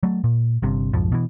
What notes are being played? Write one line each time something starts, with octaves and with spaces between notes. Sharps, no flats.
F#3 A3
A#2
G1 G2 C3
B1 F2 G#2 F3
B2 E3